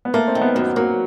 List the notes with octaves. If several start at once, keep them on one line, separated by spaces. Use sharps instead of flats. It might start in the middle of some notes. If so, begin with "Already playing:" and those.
B3
A3 A#3
C4
D#3
B3
F#2 B3
F#3 A#3